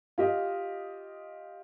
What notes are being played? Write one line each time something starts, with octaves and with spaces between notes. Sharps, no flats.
F4 G4 D#5